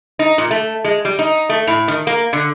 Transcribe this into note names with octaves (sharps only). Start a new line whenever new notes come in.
D#4
A#2
A3
G#3
G3
D#4
A3
A2
D#3
A#3
D3